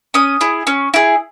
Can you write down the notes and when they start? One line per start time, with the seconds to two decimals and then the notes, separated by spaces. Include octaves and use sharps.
0.14 C#4 D#6
0.41 E4 G#4
0.67 C#4
0.94 E4 G#4